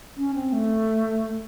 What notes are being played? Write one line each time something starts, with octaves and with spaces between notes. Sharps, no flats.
C#4
C4
A3